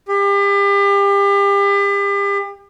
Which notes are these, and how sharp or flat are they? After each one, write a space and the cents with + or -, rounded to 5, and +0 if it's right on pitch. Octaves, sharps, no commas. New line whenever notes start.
G4 +35